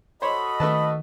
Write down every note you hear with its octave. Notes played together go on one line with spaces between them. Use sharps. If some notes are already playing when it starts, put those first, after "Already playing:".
F#4 A4 C5 C#5 D#5 B5
D#3 A3 B4 A5